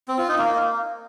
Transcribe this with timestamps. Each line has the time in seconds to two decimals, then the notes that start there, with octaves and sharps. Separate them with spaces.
0.08 C4
0.18 F4
0.28 D#4
0.38 A#3